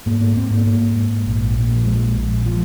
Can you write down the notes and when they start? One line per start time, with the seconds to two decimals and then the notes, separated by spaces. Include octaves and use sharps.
0.06 G#2 A#3
0.21 A#3
0.36 G#2 C4
0.51 A#3
0.66 G#2 A#3
0.96 G#2
1.26 A#1
1.56 A#2
1.76 F3
1.86 A#1 G#3
2.16 A#1
2.46 F3